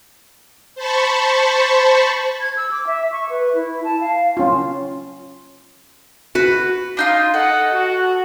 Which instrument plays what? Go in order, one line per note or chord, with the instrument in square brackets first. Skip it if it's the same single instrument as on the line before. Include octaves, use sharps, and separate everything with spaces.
[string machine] C5 A5 B5 C#6
[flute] G#6
E6
D6
E5
C#6
B4
E4
A5
F5
[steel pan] C#4 F4
[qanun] F#4 B4
[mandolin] D4 D#4 F4
[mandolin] A4 [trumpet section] D#5 F#5
[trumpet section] F#4